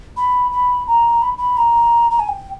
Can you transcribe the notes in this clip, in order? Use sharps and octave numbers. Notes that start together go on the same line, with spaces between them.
B5
B5
A#5
B5
B5
A#5
A#5
G#5
G5